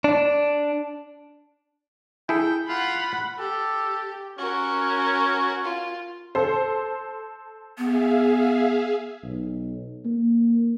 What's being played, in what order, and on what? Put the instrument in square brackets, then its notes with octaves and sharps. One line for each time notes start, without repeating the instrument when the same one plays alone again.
[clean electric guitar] D4
[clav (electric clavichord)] E4 G#4 A4 [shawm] G5
[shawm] F4 [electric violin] F#5 B5
[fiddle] G4 [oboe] A4
[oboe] C#4 [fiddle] F#4 A#4
[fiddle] F4
[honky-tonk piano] A4 C5
[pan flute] B3 [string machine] G#4 E5 F5
[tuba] B1
A#3